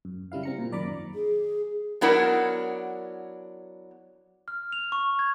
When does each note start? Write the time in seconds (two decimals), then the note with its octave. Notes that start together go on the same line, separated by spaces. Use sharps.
0.05 F#2
0.32 C#3 G3 E4 F5
0.43 C4 A#5 C#7
0.59 A#2
0.71 F#2 D#3 D5 A#5 B5 D6
1.14 G#4
2.01 F#3 B3 D4 E4 A#4 F#5
4.48 F6
4.73 F7
4.92 C#6
5.19 G#6